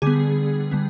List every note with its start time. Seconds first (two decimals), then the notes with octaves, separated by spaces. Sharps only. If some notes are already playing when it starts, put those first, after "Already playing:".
0.02 D3 G3 B3 G#4
0.71 D3 G3 B3